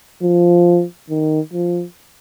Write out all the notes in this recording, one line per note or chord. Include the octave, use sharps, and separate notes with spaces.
F3
D#3
F3